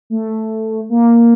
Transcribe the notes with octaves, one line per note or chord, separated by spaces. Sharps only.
A3
A#3